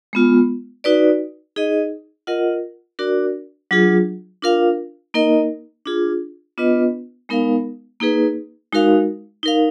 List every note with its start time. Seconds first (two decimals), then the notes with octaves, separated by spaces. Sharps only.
0.13 G#3 B3 F4
0.84 D#4 F#4 B4 D5
1.56 D#4 G#4 D#5
2.27 F4 A#4 D#5 F#5
2.99 D4 F#4 A#4 D5
3.71 F#3 D4 F4 G#4
4.42 D4 F4 A#4 F5
5.14 A#3 D#4 A#4 D#5
5.86 D4 F4 G#4
6.58 B3 D4 F4 B4 D#5
7.29 G#3 B3 D#4 A#4 F5
8.00 A#3 D#4 G#4 B4
8.72 G#3 D#4 F#4 A#4 F5
9.43 D#4 A#4 F5